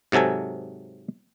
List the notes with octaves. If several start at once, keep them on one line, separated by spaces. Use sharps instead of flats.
G#2 C3 F#3 A4 G#5